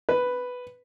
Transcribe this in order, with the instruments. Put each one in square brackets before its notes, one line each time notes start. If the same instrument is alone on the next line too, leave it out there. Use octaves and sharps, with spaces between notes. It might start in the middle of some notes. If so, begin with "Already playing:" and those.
[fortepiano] B4